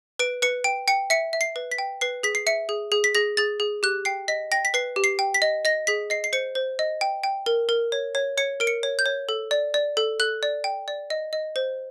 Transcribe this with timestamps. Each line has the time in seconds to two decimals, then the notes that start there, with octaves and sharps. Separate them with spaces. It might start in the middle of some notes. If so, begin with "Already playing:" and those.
0.19 B4 D7
0.42 B4 C#7
0.64 G5 D7
0.88 G5 C#7
1.10 E5 C#7
1.33 E5
1.41 C7
1.56 B4
1.72 B6
1.78 G5
2.01 B4 C7
2.23 G#4 B6
2.35 C7
2.47 E5 C#7
2.69 G#4
2.92 G#4
3.04 B6
3.15 G#4 A#6
3.37 G#4 A6
3.60 G#4
3.83 G4 F#6
4.05 G5 C7
4.28 D#5 B6
4.52 G5 A#6
4.65 B6
4.74 B4 C7
4.96 G4
5.04 C7
5.19 G5
5.34 B6
5.42 D#5
5.65 D#5 A#6
5.87 G#4 B6
6.10 D#5 C7
6.24 C7
6.33 C5 C#7
6.55 C5
6.79 D#5
7.01 G5
7.24 G5
7.46 A#4
7.69 A#4
7.92 C#5
8.15 C#5
8.38 C#5 C#7
8.60 A#4 D7
8.67 C#7
8.83 C#5
8.99 G6
9.06 C#5
9.29 A4
9.51 D5
9.74 D5
9.97 A4
10.20 A4 F#6
10.43 D5
10.64 G5
10.88 D5
11.10 D#5
11.33 D#5
11.56 C5